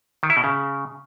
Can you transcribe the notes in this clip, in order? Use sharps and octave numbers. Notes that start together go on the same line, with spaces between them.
D#3
E4
B2
C#3